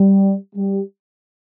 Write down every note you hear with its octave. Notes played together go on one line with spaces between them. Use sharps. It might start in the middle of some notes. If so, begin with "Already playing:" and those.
Already playing: G3
G3